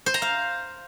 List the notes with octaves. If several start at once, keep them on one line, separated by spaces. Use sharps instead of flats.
C5
A#5
F5